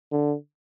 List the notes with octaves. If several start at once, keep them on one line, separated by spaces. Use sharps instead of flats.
D3